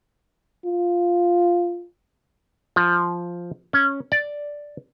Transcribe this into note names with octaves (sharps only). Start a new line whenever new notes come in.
F4
F3
C#4
D5